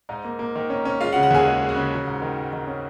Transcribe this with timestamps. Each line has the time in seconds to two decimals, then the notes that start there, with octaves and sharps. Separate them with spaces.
0.09 G#2 D#4 D#5
0.25 A#3
0.39 A#3
0.56 D#3
0.70 C#4
0.85 C#4
1.00 G#3 F4 F5
1.13 F#4 F#5
1.16 C#3
1.23 F#4 F#5
1.31 D#2 G#4 G#5
1.46 G#3
1.62 G#3
1.69 F#4 F#5
1.76 C#3
1.92 F#3
2.07 G#2
2.22 D#3
2.37 G#2
2.53 D#3
2.67 C#4